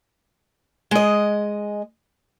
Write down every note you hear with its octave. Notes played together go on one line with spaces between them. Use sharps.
G#3 D#5